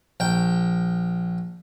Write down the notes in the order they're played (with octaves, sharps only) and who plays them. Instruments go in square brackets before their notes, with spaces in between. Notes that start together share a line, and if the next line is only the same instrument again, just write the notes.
[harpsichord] A#1 G5